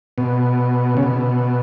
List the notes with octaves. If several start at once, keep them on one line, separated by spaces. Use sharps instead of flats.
B2
C#3
B2